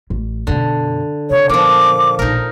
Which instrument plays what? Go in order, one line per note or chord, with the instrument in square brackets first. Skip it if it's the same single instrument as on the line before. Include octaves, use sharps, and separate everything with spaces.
[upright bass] A1
[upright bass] F#2 B2 [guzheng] D3
[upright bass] C3 [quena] C#5
[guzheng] A#2 F3 [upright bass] B3 D#4 [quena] D6
[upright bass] A#1 B2 [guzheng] D#4 A#4